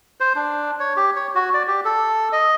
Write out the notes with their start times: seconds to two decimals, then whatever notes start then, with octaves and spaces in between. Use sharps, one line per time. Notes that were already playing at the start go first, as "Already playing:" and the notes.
0.20 C5
0.36 D4
0.80 C#5
0.97 G4
1.16 C#5
1.35 F#4
1.54 D5
1.67 G4
1.85 A4
2.32 D#5